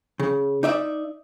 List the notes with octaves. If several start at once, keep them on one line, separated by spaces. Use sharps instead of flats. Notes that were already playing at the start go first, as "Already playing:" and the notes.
C#3
D#4 D5 E5